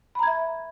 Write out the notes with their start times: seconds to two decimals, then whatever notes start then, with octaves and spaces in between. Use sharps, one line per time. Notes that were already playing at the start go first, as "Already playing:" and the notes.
0.15 B5
0.19 A#5
0.23 G#6
0.27 E5